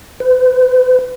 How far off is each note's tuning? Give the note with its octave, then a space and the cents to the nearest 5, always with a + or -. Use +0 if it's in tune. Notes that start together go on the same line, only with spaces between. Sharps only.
B4 +45